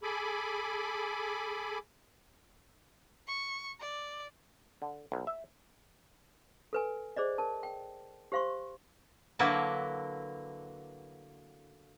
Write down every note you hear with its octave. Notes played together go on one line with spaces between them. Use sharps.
G#4 A4 G#5 B5 D6
C#6
D5
D3
B1
E5
A4 B4 G#5
G#4 C5 D5 D#5
A#4 A5
G5
G4 C5 F5 C6 C#6
D3 F#3 A#3 E4 B4 A5